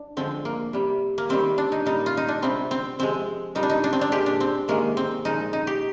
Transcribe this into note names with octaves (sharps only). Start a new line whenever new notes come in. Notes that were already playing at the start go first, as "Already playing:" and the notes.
Already playing: D4
D3 F3 G#3 C4
A#3
C3 G3
A#3
C3 D#3 G3 C4
D4
D#4
A#2 G3 D#4
F4
D#4
D4
C3 G3 C4
C4
C3 F3 G#3 C4
A#2 G3 D#4
D4
D#4
D4
C4
D4
A#2 G#3 G4
D4
C4
C3 D#3 G#3 A#3
C4
A#2 F3 G#3 D#4
D#4
G4